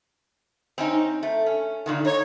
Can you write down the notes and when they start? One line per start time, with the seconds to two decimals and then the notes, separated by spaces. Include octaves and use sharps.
0.78 C4 C#4 D#4
1.23 A3
1.46 C#4
1.86 A#2 D3 D#3
2.05 D#4 C#5